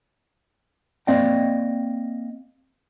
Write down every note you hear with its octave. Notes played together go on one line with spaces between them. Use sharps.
A#3 C4 D5 D#5 F5 G5